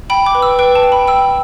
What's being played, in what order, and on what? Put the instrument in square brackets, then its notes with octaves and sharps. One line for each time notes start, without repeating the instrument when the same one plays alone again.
[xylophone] G5 B5
D6
B4
E6
B4 G5
A5
G5
B5
G5 E6